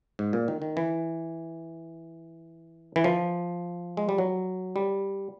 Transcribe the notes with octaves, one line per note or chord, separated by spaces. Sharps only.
G#2
A#2
D#3
D#3
E3
E3
F3
G#3
G3
F#3
G3